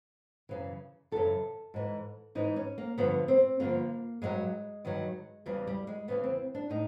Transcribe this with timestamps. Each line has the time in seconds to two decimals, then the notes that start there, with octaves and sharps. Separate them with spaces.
0.49 F#2 C#3 E3
1.12 F#2 C#3 E3 A4
1.74 G#2 E3
2.35 G#2 E3 D#4
2.56 C#4
2.78 A#3
2.98 G2 D3 F3 B3
3.28 C4
3.60 G2 D3 F3 A#3
4.22 G2 D#3 F#3 G#3
4.85 G2 D#3 F#3
5.46 E2 C#3 E3 G3
5.67 G3
5.87 G#3
6.08 E2 C#3 E3 B3
6.24 C4
6.55 D4
6.70 A2 D#4